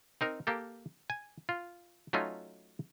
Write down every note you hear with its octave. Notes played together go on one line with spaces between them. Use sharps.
C4 D#4 A#4
A#3 G4 A4
G#5
F4
F#3 A3 C#4 D#4 F4